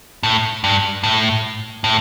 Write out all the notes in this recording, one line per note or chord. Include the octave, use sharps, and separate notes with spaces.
A2
G2
A2
A2